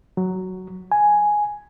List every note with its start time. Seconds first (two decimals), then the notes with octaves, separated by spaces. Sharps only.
0.17 F#3
0.92 G#5